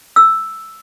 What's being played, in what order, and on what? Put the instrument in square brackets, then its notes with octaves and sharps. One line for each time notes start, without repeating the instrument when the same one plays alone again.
[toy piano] E6